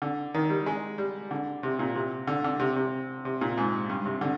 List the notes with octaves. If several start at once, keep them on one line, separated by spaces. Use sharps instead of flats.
D3
D#3
G3
G#3
G3
D3
C3
A#2
C3
D3
D3
C3
C3
C3
A#2
G#2
G2
C3
D3